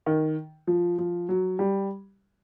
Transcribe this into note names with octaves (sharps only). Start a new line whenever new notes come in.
D#3
F3
F3
F#3
G3